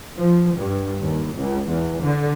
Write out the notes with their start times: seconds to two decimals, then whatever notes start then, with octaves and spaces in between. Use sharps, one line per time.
0.18 F3
0.56 G2
1.01 D#2
1.37 C#2
1.68 E2
2.03 D3